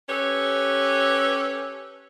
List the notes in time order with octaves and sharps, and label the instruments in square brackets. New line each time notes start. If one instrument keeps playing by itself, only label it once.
[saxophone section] C#4 G4 A4 B4 C#5